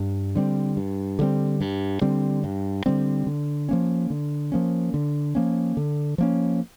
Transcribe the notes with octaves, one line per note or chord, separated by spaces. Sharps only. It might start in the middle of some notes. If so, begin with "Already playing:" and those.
Already playing: G2
D3 G3 C4
G2
D3 G3 C4
G2
D3 G3 C4
G2
D3 G3 C4
D3
F3 A#3 C#4
D3
F3 A#3 C#4
D3
F3 A#3 C#4
D3
F3 A#3 C#4